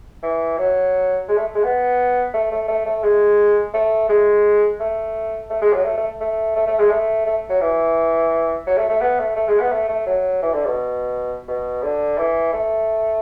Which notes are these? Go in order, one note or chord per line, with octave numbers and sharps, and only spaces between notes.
E3
F#3
G#3
A3
G#3
B3
A3
A3
A3
A3
G#3
A3
G#3
A3
A3
G#3
F#3
A3
A3
A3
A3
A3
G#3
A3
A3
F#3
E3
F#3
A3
A3
B3
A3
A3
G#3
B3
A3
A3
F#3
E3
D3
B2
B2
D3
E3
A3